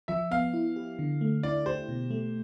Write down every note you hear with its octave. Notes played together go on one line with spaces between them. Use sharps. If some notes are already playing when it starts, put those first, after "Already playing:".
F3 E5
B3 F5
E4
G4
D3
A3
E4 D5
G4 C5
B2
A3